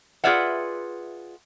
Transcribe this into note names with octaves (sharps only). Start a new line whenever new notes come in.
F4 G#4 B4 D5 E5 F#5